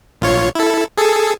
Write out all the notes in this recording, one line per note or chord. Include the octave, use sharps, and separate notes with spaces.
A#1 F4 C#5
E4 A4
G#4 A4